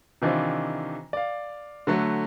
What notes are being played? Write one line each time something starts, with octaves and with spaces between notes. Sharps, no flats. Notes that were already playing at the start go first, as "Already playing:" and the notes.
C3 D#3 E3 D4 F4 C5
D5 F5
D3 F#3 A3